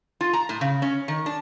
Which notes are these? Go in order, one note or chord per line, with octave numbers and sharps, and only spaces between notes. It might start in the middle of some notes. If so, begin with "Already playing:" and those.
F4
A#5
A2
C#3
C#4
D#3
D4